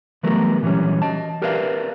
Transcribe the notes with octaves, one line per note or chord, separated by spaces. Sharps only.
E3 F#3 G3 A3 B3 A#4
A#2 E3 F#3 G3 C#4
D#5 A5
G4 A#4 B4 D5 E5 F5